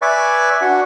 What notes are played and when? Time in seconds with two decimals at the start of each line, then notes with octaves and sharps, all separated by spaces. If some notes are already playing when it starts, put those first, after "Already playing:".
0.02 B4 D5 E5 G#5 C#6 D6
0.62 D4 F#4 F#5